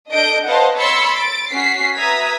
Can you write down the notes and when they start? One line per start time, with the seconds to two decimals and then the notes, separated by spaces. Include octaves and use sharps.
0.10 D4 A4 D#5 G6 D7
0.45 B4 C5 D#5 F5 F#5 A5
0.75 C#5 B5 C6 E6 A6 C#7
1.15 A6 D7
1.52 C#4 F#4 B6 C7
1.98 B4 E5 A#5 D#6 G#6 B6